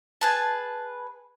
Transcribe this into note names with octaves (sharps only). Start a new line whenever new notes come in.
G#4 B4 A5